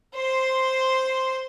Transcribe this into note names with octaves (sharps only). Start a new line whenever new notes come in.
C5 C6